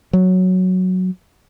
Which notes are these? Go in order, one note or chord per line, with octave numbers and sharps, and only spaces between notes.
F#3